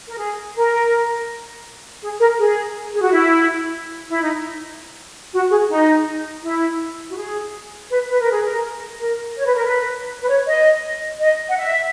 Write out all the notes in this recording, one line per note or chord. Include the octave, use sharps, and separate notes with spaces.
A#4
G#4
A#4
G#4
A#4
G#4
G#4
F#4
E4
E4
D#4
F#4
G#4
D#4
E4
F#4
G#4
B4
B4
A#4
G#4
A#4
A#4
C#5
B4
A#4
B4
B4
C#5
D#5
D#5
F#5
E5